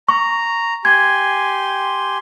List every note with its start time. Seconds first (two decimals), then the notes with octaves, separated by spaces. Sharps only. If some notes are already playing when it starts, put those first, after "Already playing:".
0.09 A#5 C#6
0.85 G4 G#5 C6 G#6